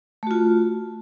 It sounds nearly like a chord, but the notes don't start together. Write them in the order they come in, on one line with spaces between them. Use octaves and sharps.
A3 F#4 F4